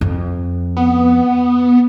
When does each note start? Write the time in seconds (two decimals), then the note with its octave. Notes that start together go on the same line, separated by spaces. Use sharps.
0.01 F2
0.77 B3